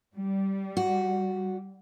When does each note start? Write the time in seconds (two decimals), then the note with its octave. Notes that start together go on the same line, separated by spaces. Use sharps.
0.16 G3
0.77 F#4